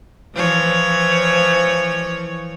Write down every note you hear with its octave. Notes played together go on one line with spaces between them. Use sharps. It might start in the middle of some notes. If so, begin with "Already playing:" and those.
E3 F3 C#5